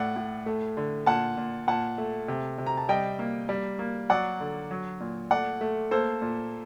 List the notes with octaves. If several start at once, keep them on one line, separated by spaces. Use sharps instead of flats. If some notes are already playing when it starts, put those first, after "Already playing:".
Already playing: A2 A3 D5 F#5
A2
A3
D3
A#2 F#5 A5
A#2
A#2 F#5 A5
A3
C3
C3
A#5
A5
G3 D#5 G5
A#3
G3
A#3
F#3 D5 F#5
D3
F#3
A#2
A3 D5 F#5
A3
A#3 A4 C5
A#2